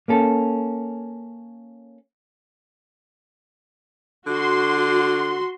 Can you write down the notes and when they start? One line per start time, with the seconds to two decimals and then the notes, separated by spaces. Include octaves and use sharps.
0.08 A#3 C#4 A4
4.27 D3 F#4 C6